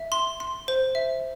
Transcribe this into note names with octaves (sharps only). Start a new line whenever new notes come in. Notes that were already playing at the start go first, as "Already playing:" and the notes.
Already playing: E5
C6
C6
C5
E5